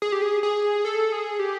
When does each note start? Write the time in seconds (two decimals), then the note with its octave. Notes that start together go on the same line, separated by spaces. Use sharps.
0.02 G#4
0.12 G4
0.22 G#4
0.43 G#4
0.85 A4
1.12 G#4
1.39 G4